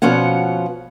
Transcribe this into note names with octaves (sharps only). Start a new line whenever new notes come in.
B2 F3 C#4 F4 F#5